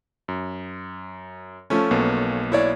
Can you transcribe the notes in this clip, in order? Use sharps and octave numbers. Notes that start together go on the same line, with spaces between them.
F#2
F3 A3 C#4
B1 A#3 B3
E4 C#5 D5